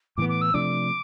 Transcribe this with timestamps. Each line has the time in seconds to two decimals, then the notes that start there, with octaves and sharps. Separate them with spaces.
0.17 A2 E3 B3 D6
0.29 D6
0.41 E6
0.54 C3 F3 A3 D4 D6